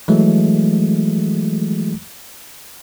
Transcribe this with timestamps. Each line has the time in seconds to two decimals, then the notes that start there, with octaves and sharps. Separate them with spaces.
0.08 E3 F#3 G#3 A3